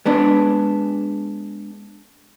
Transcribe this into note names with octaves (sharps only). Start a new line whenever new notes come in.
G#3 B3 D4